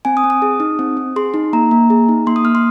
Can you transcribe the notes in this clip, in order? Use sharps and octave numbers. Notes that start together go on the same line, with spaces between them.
C4 G#5
D#6
C4
D#6
G#4
D#4
C4
C4
G#4 C6
D#4
A#3 A#5
A#3
G#4
D#4
A#3 C6
D#6
A#3 F6
C6